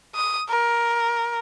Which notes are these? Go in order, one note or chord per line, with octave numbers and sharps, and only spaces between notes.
D#6
A#4